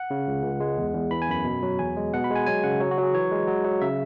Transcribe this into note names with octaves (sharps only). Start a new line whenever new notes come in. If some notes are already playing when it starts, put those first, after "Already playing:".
Already playing: F#5
C#3
C#2
C#2
G#3
E2
E2
E3 B5
G#5
F#2 B5
B2
F#3
E2 G#5
G#3
B2 F#5
B5
G#3
G#5
F#3 G#5
C#3 F#5
F#3 C#5
F#4
F#3 G#4
E3 C#5
G#3
F#3
F#3
C#3 E5